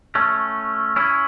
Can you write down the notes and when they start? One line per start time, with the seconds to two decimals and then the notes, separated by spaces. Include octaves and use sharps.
0.15 A3 C#4
0.96 C#4 E4